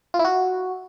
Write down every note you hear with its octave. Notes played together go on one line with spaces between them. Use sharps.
F4
E4
F#4